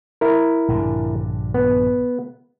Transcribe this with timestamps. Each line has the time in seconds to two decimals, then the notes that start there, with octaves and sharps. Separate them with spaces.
0.21 E4 A#4
0.68 A#1 G2 D3
1.54 B3